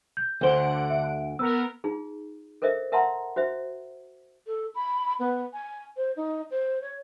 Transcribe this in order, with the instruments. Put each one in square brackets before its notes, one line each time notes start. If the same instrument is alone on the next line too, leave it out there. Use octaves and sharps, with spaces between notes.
[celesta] G6
[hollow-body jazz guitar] D2 C5 [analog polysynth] D3 F#5 D7
[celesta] E5
[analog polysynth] B3 A#4 [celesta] E6
[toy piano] D#4 F4 G#4
A4 A#4 C5 D#5 E5
A#4 E5 F#5 A5 A#5 C6
F#4 C5 E5
[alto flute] A4
B5
B3
G#5
C5
D#4
C5
C#5